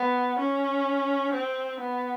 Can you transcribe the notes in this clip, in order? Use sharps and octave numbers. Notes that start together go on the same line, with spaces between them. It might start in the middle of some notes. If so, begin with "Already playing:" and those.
Already playing: B3
C#4
C4
B3